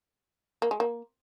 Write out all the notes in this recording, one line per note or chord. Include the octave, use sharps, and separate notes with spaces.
A#3
G#3
A#3